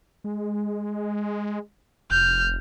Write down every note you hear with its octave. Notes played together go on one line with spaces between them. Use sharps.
G#3
F1 F6 G6